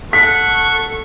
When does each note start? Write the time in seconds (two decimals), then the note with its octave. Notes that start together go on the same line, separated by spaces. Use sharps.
0.13 A4 F#5 C#6 B6